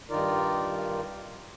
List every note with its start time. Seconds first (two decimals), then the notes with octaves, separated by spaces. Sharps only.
0.10 G2 D#3 D#4 F4 A#4 D5